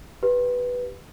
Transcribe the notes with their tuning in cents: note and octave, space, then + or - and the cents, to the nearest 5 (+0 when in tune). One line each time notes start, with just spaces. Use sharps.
G4 +0 B4 +0